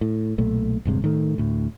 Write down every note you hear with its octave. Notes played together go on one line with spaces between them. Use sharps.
A2
B1 A#2 A3
D#1 G2 C3 G#3
A2 D#3 A3
D2 A2